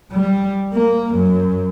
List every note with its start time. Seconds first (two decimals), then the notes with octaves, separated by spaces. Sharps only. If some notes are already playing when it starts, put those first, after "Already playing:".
0.12 G3
0.73 A#3
1.15 F#2